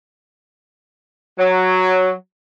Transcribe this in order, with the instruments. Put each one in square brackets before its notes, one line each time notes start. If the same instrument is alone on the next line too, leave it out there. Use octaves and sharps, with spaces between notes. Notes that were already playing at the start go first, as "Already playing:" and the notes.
[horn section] F#3